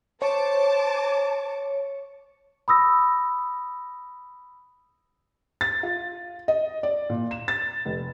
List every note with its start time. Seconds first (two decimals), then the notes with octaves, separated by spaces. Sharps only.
0.22 C5 C#5 A5 D6
2.68 B5 D#6 E6 A#6
5.61 A6
5.83 F4
6.48 D#5
6.83 D5
7.10 A#2
7.31 E7
7.48 A6
7.85 F1